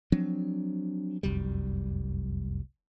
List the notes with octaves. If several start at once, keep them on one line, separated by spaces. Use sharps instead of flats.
F3 F#3 C4 D4
F1 C2 F#2 G3